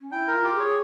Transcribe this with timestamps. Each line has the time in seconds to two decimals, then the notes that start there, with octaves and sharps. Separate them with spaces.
0.01 C#4
0.12 E4 G5
0.28 A#4
0.34 F4
0.44 G4
0.54 G#4
0.60 C#5